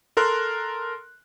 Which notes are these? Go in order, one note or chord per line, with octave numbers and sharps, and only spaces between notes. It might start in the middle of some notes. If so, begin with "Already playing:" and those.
A4 A#4 C6 F#6